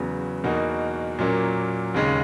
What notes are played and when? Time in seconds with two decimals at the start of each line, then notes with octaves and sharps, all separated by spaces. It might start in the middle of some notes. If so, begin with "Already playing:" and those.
Already playing: E2 C#3 F#3 B3
0.44 E2 B2 A#3 D#4 F#4
1.19 A#2 F#3 A#3 C#4
1.94 D#2 C#3 G#3 C#4